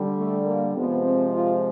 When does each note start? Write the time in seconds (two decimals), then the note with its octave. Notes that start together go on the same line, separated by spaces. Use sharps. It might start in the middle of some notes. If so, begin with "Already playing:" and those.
Already playing: D3 G3
0.17 A3
0.45 A#3
0.74 C3 F3 G#3 B3
1.03 C4
1.32 F4